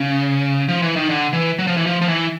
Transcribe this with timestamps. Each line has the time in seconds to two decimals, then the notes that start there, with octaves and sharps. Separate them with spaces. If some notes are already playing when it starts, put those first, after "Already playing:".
Already playing: C#3
0.68 F3
0.82 E3
0.96 D#3
1.09 D3
1.33 E3
1.59 F#3
1.67 F3
1.77 E3
1.86 F3
2.01 F3
2.08 E3